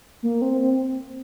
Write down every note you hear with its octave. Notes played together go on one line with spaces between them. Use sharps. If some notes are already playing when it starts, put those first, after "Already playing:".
A#3
C4
C4